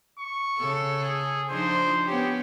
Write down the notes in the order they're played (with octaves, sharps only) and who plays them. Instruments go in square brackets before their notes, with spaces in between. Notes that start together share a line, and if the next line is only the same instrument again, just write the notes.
[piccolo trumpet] C#6
[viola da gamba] C#3 A4
[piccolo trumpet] G#4
[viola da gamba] F3 D4 D#4 [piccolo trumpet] C5
[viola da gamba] B3 C#4 [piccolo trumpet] G4